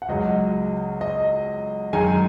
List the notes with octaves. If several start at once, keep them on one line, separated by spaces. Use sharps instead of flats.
F#5
C#2 C#3 F#3 D#5
D#5
F#2 D#3 G#3 G#5